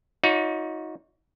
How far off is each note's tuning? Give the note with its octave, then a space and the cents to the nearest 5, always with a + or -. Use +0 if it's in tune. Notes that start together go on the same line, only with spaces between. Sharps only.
D#4 +25 F#4 -35 C#5 +40